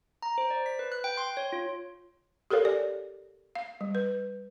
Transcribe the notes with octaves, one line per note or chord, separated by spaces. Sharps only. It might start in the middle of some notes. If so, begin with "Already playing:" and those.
A#5
C5
D5
B6
B4
F#6
G5
C6
C#5
F4
G4 A4 A#4 C#5 F5
D5
F5
G3
B4